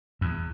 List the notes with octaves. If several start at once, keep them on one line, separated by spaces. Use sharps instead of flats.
E2